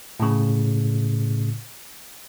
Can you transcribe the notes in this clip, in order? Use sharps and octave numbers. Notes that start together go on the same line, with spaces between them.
A2 C#3